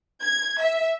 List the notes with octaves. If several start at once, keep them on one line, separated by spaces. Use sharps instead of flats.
G#6
E5